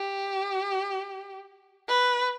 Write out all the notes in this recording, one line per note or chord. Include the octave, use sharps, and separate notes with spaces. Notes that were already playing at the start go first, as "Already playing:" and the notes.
Already playing: G4
B4